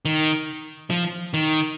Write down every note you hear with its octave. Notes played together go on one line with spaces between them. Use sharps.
D#3
F3
D#3